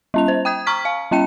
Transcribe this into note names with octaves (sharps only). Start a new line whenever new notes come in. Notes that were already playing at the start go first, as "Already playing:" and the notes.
G3 C#4 F7
C5
G5 D#6 G#6
A#5 C#6 F6 B6
F5
G3 C#4 G5 C#7